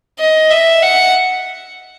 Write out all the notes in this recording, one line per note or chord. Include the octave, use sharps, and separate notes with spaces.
D#5
E5
F#5